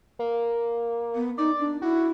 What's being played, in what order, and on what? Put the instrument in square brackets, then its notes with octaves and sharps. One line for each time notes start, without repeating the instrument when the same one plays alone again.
[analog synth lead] A#3
[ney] B3
[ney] D#4 [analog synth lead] D5
[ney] D4
[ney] E4 [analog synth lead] F#4